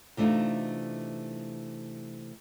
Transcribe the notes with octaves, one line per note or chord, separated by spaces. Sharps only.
C3 E3 A3 D4 D#4 F4